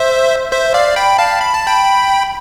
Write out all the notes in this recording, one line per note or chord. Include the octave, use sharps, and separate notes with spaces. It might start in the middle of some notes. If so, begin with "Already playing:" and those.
Already playing: C5 E5
C5 E5
D5 F5
G5 B5
F5 A5
B5
A5
G5 B5